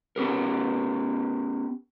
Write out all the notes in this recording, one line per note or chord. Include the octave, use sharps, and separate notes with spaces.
B3 C#4 G4 A#4